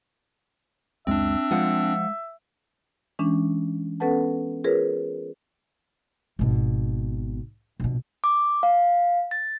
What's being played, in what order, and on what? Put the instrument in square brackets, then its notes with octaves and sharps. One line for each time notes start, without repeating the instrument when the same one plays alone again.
[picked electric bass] C#2 F#2 G#3 [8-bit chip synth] C4 D4 [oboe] E5
[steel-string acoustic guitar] F3 F4 F#5 [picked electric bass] G#3
[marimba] E3 G#3 C#4 D4
B3 C#4 A4 B4 F#5 A5
F4 G#4 A#4 B4 C#5
[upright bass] G#1 B2
A#1 B2
[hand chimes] D6
F5
A6